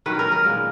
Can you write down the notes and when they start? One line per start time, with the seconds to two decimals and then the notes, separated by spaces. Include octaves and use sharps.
0.06 D#3 F#3 C#4 B4
0.19 A#4
0.32 A#4
0.45 A#2 G#3 B3